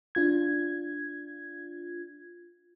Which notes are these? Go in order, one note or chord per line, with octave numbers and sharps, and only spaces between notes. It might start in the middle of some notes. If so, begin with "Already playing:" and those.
D4 F4 G#6